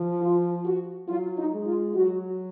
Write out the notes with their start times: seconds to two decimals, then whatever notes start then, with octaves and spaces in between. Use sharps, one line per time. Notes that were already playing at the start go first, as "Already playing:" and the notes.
Already playing: F3
0.21 F4
0.65 F#4
1.08 F#3 F4
1.37 D#4
1.53 G#3
1.66 F4
1.95 F#3 F#4